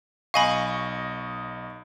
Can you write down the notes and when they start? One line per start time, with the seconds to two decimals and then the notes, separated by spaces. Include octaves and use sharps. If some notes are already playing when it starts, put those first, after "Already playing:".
0.34 B1 D#5 F5 G#5 B5 C#6